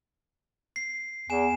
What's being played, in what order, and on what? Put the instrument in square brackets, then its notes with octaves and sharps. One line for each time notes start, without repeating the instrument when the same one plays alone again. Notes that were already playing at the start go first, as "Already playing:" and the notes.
[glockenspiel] C7
[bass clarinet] E2 [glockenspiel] G#5 E7